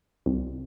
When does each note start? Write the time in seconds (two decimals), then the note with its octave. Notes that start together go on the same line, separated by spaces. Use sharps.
0.26 C2